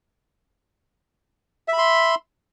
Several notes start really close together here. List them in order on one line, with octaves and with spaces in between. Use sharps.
E5 B5 C6